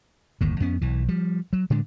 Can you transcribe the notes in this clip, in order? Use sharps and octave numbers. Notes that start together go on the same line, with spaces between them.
G1 D#2 A2
F2 B3 C#4
B1 E3
F3 G3
F#3
A2 D3 G#3 D4